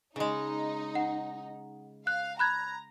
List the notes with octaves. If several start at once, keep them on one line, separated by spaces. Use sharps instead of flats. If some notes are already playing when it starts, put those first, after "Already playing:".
C#3 G#3 D#4
F#5
F5 F#6
A#5 B5 F#6 G#6